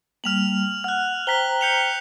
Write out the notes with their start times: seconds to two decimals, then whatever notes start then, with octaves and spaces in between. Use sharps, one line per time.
0.24 G3 A#3 F6 F7 F#7
0.84 F#5 F6 F#6
1.27 C5 G5 A#5 F#6 B6 G7
1.61 G6 C#7 F7